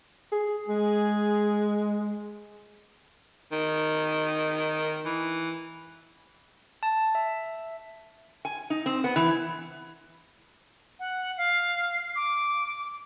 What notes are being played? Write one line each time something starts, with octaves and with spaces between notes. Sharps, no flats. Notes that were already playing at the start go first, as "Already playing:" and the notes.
G#4
G#3 G#4
D#3
E3
A5
E5
G#5
D#4
C4
B3
E3
F#5
F5
D6